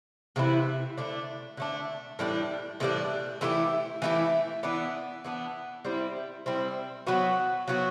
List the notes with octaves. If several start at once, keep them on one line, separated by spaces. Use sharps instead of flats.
C3 E3 A3 E4
D3 A3 D4
D3 A3 D4
A2 E3 G3 D4
A2 E3 G3 D4
E3 A3 E4 G4
E3 A3 E4 G4
E3 B3 D4
E3 B3 D4
G3 C4 E4
G3 C4 E4
F#3 B3 F#4
F#3 B3 F#4